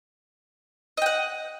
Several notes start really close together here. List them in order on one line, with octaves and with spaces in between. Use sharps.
D#5 G5 F#5